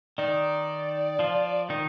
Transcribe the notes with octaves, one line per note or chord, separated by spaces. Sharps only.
D#3 D#4 D5
F3 F4
D#3 D#4